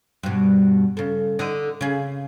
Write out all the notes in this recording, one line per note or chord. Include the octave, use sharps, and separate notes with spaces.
G2 B2
C#3 A4
D3 D#4 D#5
C#3 G#4